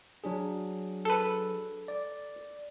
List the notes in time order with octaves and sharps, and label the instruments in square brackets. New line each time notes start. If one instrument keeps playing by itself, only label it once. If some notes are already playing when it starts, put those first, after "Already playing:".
[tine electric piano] F#3 D4 G#4
[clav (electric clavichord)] A4 B4
[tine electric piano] D5